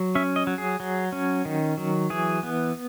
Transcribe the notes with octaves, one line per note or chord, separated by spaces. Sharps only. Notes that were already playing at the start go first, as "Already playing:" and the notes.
Already playing: F#3
C#4 E5
D#5
F#3
G#4
F#3
C#4
D#3
F#3
E3 G#4
B3